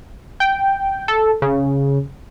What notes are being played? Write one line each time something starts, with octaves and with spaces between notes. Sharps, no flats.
G5
A4
C#3